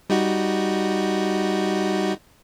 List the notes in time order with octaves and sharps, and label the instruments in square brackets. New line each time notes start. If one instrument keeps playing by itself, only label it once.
[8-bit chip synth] G3 D#4 F#4